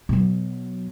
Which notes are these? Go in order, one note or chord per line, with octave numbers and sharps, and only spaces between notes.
B2 F#3